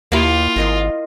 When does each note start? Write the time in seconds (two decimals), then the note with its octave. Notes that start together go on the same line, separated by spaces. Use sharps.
0.12 D#2 A#3 E4 F4 G4 A5
0.56 G#1 A#4 D#5 C6